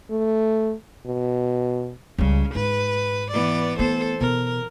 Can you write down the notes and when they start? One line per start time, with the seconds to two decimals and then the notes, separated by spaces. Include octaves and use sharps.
0.10 A3
1.06 B2
2.18 C#2 C#3 G3
2.55 G#2 B4
3.32 E3 B3 D5
3.79 A3 B3 A4 C5
4.20 B2 A#4